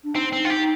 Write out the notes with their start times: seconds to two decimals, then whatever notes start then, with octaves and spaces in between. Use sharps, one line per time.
0.04 D4
0.15 C4 D#4
0.32 C4
0.45 F4
0.50 G4